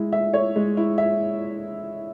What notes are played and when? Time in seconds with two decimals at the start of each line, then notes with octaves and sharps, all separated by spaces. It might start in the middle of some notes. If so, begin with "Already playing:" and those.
Already playing: G#3 E4
0.13 E5
0.33 C#5
0.56 G#3
0.77 E4
0.98 E5